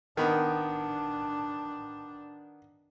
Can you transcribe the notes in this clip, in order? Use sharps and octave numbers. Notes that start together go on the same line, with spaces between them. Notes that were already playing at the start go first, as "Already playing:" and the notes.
D#3 B3 D4